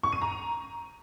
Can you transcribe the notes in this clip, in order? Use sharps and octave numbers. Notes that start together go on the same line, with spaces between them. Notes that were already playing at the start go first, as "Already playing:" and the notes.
C#6
D#7
A#5